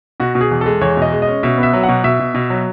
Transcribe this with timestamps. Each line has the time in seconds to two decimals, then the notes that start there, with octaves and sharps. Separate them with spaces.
0.20 B2 F#4
0.35 B2
0.41 G#4
0.51 E2
0.61 G#3 A4
0.81 E2 C#5
0.97 B2
1.02 D#5
1.12 G#3
1.22 D#5
1.27 C#4
1.43 B2 E5
1.58 B3
1.63 E5
1.73 F#3
1.83 B2 F#5
2.04 B2 E5
2.19 B2
2.35 B2
2.50 F#3